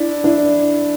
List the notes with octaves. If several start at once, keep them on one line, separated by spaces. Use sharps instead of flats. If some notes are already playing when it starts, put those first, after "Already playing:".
Already playing: D4 E4
D4 E4